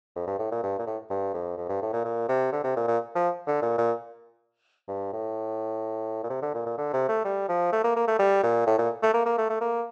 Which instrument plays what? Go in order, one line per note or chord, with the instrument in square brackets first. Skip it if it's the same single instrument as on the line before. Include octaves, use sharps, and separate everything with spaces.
[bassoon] F2
G2
A2
A#2
G2
A#2
A2
G2
F2
F2
G2
A2
A#2
A#2
C3
D3
C3
A#2
A#2
F3
D3
A#2
A#2
G2
A2
A#2
C3
D3
A#2
A#2
D3
C3
A3
G3
F3
A3
A#3
A#3
A3
G3
A#2
A2
A#2
A3
A#3
A#3
A3
A3
A#3